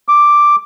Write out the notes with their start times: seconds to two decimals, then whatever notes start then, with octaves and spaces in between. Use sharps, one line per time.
0.08 D6